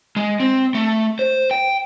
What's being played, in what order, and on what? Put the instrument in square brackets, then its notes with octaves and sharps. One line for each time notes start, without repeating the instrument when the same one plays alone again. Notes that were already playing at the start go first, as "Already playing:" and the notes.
[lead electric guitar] G#3
C4
A3
C5
G5